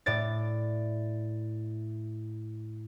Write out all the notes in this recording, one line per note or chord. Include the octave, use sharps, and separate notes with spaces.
A2 D5 A6